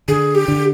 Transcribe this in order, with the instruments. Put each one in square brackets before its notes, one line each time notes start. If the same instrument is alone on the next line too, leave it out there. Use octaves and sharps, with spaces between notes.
[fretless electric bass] D3 [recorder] G#4
[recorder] G4
[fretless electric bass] D3